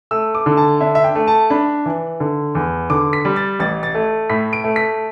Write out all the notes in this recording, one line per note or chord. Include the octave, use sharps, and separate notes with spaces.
A3 E6
D6
D3
A5
D4 E5
E5
G5
A3
A5
D4 B5
E3
D3
E2
D3 D6
B6
G3
A6
A1 A6
A6
A3
A2 B6
D7
A3
B6